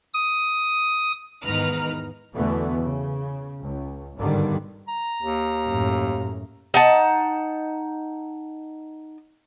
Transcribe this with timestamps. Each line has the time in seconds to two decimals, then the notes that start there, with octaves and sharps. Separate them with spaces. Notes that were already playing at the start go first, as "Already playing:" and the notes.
0.14 D#6
1.42 E2 G#2 D#3 B4 A#5 F6
2.33 E2 B2 D3 E3 A3 B3
2.82 C#3
3.62 C#2
4.16 G#1 G2 B2 D3 D#3 G3
4.88 A#5
5.22 D#2
5.68 F#2 A2
6.74 D#4 F#5 A5